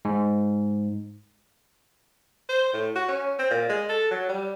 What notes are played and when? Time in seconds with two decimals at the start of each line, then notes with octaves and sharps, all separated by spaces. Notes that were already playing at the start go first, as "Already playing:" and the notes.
0.05 G#2
2.49 C5
2.73 A2
2.95 F#4
3.08 C#4
3.39 C4
3.51 A#2
3.69 G#3
3.89 A4
4.11 F#3
4.29 G3